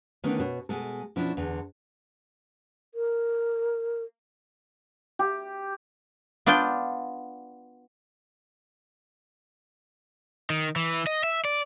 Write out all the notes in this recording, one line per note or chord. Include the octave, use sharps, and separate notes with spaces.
D3 D#3 A3 B3 C#4 D4
B2 F#4 C#5
B2 G#3 A4
B2 F3 C#4 D4 E4
E2 D3
A#4
G4
B3 D4 F4 D5 G5
D#3
E3
D#5
E5
D5